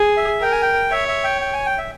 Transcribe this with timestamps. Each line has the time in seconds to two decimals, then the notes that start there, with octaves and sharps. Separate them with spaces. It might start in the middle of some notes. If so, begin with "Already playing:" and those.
Already playing: G#4
0.17 E5
0.41 A#4 G5
0.52 G#5
0.62 G5
0.91 C#5 E5
1.08 E5
1.24 G5
1.41 G5
1.53 G#5
1.66 G5
1.78 E5